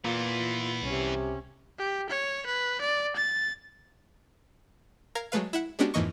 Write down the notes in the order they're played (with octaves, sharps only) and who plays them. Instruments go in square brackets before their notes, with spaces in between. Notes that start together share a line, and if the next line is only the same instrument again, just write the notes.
[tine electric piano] A#2 [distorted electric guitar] E3 B3 [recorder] F4
[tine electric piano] C2 [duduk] C3 [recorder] C#4
[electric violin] G4
C#5
B4
D5
A6
[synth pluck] A#4 F5 A#5 G#6
F#3 G#3 A3 B4 F5
E4 E5 F#5
G#3 B3 C#4 D4 F#4 G4
F2 G#2 E3 A#3 D#5 C#6